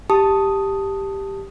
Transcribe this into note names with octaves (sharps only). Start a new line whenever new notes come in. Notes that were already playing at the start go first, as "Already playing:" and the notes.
G4 A5 D#6